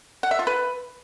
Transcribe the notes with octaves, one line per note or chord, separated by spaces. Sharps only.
F#5
E5
F4
B4